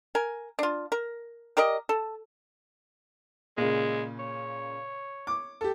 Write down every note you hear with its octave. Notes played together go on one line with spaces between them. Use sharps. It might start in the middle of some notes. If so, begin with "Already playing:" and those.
A#4 G#5
D4 F4
A#4
G4 A#4 D5 D#5
A4
A#2 C#3 G#3
C#5
D6
G4 A4